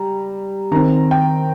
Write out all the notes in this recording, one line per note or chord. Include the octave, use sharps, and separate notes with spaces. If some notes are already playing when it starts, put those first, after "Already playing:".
Already playing: G3 A#5
D#3 C4 A#5
G5